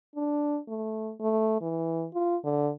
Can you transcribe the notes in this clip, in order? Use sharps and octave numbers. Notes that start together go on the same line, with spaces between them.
D4
A3
A3
E3
F4
D3